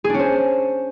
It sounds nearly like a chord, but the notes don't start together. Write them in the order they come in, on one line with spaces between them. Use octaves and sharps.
G#4 D4 C#4 C5